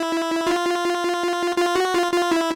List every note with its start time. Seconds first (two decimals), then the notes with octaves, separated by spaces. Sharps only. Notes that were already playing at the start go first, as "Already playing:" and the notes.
Already playing: E4
0.47 F4
1.57 F4
1.75 F#4
1.94 F4
2.12 F4
2.31 E4